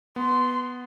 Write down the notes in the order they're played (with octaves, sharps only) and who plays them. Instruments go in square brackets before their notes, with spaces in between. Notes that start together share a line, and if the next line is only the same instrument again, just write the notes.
[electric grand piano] B3 [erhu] C6